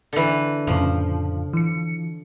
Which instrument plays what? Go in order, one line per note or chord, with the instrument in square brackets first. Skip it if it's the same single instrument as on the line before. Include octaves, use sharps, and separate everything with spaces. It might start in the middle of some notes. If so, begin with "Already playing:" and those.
[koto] D3 E3
[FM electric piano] F2 A2 C#3 [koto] F3
[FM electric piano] E3 C#7